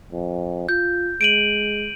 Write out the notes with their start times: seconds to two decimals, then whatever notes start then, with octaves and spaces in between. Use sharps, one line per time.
0.12 F2
0.69 F4 G6
1.21 G#3 D7 D#7 F#7